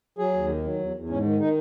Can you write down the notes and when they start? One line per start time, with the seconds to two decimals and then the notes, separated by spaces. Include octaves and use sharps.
0.18 F#3 G#4
0.34 D#2
0.48 D#3
0.64 F#3
0.79 E2
0.94 E2
1.09 G#2 C#4
1.25 D#3
1.40 D#3 D#4